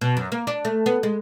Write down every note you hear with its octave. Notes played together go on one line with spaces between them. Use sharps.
B2
F#2
A#3
D4
A3
B3
G#3